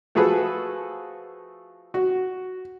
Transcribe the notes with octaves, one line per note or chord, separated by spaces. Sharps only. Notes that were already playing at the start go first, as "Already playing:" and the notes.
F3 A3 F#4 G#4 A4 B4
F#4